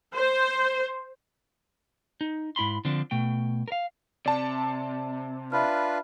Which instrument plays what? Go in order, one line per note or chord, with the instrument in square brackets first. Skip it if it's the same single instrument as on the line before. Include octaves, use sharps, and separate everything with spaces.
[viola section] C5
[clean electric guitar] D#4
G#2 E4 B5 C6
D3 F3 C4 D4
B2 A3 G5
A#4 F5
[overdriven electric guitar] C3 [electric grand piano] D5 A5
[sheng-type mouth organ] D4 F4 B4 [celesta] E5 B5 F6